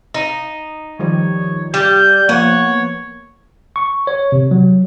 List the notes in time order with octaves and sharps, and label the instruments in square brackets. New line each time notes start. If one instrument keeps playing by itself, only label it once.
[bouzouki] D#4
[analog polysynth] D#3 F3 G3 [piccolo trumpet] C#5
[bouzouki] G3 [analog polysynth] G4 [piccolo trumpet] G6
[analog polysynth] F3 A#3 B3 [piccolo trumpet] C#5 [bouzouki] F#5
[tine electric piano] C#6
C#5
C3
F#3